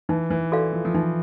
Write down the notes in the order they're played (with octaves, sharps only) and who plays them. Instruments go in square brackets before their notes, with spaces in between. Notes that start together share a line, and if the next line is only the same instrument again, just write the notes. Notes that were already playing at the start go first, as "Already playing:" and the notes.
[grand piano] E3 [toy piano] D#4
[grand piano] E3
[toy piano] F#4 A4 D5 F5
[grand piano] F3
F3
[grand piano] E3 [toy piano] D#4